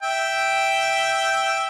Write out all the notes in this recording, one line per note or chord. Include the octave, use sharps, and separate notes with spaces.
E5 G5